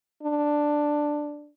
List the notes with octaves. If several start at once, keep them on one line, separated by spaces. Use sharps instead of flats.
D4